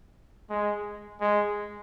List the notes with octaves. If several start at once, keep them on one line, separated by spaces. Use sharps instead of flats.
G#3
G#3